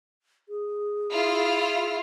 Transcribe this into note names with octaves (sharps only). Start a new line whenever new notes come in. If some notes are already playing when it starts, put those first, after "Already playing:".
G#4
E4 F4 F6